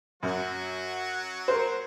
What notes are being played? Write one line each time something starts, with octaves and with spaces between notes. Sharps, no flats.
F#2 F#3 F#4
A#4 C5